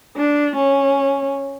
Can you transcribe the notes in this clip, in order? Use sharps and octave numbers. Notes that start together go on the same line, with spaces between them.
D4
C#4